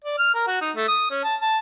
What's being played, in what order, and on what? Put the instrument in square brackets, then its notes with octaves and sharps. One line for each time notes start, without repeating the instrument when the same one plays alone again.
[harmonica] D5
F6
A#4
F#4
D#4
A3
D#6
C#4
A5
A5